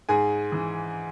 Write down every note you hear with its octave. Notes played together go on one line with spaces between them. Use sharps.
G#2 G#4 G#5
E3